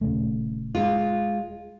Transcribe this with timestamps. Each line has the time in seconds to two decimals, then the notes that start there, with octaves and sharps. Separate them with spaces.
0.01 D#1 C#3 A3
0.75 G#3 F4